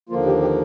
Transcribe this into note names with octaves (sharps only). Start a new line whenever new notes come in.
D#2 D3 F3 A#3 F4
G4
G4